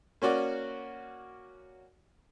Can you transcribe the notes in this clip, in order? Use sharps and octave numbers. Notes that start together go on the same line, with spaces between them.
A#3 C#4 F#4 D5